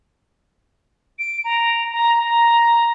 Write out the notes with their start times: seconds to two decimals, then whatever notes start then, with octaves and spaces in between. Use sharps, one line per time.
1.19 D7
1.44 A#5
1.92 A#5
2.23 A#5